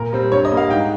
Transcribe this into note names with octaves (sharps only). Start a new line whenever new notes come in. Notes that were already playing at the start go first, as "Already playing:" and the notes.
Already playing: A#2 A#4
G3 C4
G2 C#5
D#5
G3 A#3
F5
G#2 G5